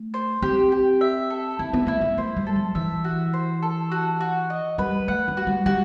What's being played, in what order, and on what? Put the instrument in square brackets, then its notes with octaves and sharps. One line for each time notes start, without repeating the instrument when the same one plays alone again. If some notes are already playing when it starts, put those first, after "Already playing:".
Already playing: [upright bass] A3
[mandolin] C5
[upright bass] C4 [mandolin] G4
[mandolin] G4
E5
A4
[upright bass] C4 [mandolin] E4
[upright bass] B3
[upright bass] A3 [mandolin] E4
[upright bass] B3
[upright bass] A3 [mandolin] C5
[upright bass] G3
[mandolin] A4
[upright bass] F#3
[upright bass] E3 [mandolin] E5
[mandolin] F#4
C5
A4
F#4
F#4
D#5
[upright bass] G3 [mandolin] B4
[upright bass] A3 [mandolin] F#5
[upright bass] A3
[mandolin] F#4
[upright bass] G3
[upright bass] G3 [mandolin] F#4